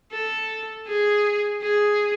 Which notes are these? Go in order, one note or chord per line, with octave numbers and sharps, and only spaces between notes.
A4
G#4
G#4